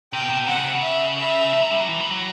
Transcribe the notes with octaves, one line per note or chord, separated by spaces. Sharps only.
C3 G5
B2
C3
B2
C3 F#5
C#3
C3
C#3
E5
E5
F3
F#3
G3
F#3
E3
G3
F#3